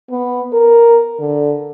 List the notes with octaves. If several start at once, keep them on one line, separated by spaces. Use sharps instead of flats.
B3
A#4
D3